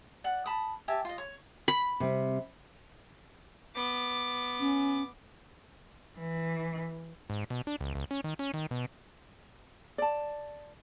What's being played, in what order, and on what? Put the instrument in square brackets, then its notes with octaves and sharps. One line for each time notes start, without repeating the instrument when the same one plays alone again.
[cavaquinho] D5 F#5
A5 B5 D#6
G4 E5 G#5 A5
F4 D#5
C#5
[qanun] B5
[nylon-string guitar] C3 G3 C4
[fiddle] B3 D6
[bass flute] C#4
[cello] E3
[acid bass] G#2
B2
D4
C#2
C#2
C#4
D#3
C#4
D#3
B2
[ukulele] D5 A5